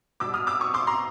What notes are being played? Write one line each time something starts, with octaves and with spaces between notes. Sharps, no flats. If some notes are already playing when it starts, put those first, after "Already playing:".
B2 G3 D6 E6
D#6 F6
D6 E6
C#6 D#6
C6 D6
A#5 C6